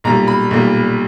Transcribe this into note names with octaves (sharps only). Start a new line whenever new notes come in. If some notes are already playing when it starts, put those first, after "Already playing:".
B1 A#2 G3 A#5
B5
B1 A#2 G3